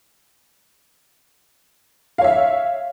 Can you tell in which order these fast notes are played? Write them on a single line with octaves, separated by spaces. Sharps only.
F5 C#5 E5